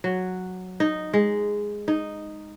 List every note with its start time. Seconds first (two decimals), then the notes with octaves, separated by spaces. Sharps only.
0.04 F#3
0.80 D#4
1.13 G#3
1.88 D#4